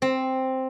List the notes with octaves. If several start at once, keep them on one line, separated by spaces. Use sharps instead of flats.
C4